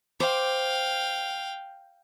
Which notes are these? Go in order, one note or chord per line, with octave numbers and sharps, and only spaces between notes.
C5 F5 G5 D6